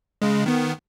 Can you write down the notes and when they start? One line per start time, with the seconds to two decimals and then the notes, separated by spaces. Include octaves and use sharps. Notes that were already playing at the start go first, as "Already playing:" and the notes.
0.22 C#3 G#3
0.46 D#3 B3